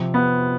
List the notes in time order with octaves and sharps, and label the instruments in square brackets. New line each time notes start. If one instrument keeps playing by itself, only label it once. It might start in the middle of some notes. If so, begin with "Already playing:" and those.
Already playing: [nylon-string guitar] C3 F3 C4
[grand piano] B3